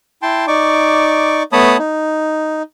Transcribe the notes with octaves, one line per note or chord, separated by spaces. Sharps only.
E4 G5 A5 C6
D#4 D5 C#6 D6
A3 B3 C#5 A5 B5 D#6
D#4